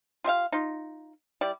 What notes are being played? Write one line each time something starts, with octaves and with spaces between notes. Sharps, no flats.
F4 G4 E5 F5
D#4 F4
G3 E4 G4 D5